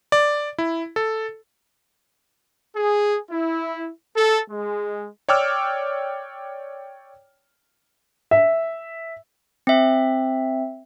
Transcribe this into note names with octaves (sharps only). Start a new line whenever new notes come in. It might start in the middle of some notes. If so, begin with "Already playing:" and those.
D5
E4
A4
G#4
E4
A4
G#3
C#5 D5 G5 D6 E6 F6
E5
C4 E5